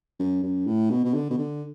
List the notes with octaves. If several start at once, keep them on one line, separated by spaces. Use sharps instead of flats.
F#2
F#2
A2
B2
B2
D3
B2
D3